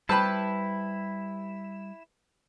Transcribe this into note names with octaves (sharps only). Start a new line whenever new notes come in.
G3 E4 G4 B4 C5 A5 B5 E6